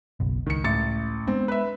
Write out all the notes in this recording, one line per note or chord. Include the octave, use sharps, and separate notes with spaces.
F#1 B1
C#2 D#3 C#7
A1 A6 C#7
G#3 B3 C4 D4
B4 E5